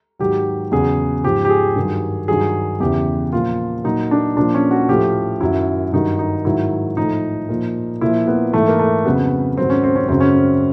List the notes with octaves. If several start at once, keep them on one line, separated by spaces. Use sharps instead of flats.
G#2 D#3 F#3 G4
E2 C#3 F#3 G#4
G#2 F3 G4
G4
G#4
G2 D#3 F#3
G2 D#3 F#3 G#4
E2 C#3 E3 G4
A#2 F3 F4
A#2 F#3 D#4
D4
A#2 F3 D4
C#4
F#4
A2 F3 G4
F#2 D#3 F#3 E4
G2 D#3 F#3 D#4
D#4
G#2 D#3 F#3 E4
A2 F3 D#4
A#2 F3
A#2 F3 E4
B3
G#2 E3 A3
A#3
A3
F2 C#3 F#3 B3
G#2 D#3 F#3 C4
C#4
C4
C#4
F#2 C#3 F#3 C4
C#4
C4